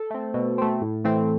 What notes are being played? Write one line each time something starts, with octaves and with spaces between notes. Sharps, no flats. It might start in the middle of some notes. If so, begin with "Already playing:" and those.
Already playing: A4
A3 C4
B2
A3 C4
A2
E3 A3 C4